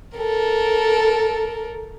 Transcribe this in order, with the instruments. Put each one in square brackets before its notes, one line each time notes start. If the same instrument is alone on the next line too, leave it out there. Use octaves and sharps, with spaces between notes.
[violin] A4 A#4